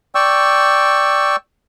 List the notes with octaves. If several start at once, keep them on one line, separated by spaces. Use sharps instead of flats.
D5 G5 C#6 E6